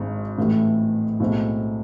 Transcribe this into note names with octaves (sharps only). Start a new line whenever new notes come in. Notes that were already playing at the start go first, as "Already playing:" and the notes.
Already playing: G#1 G#2 G#3 D4
A1 A2 E3 A3 E4
B1 A2 G#3 C4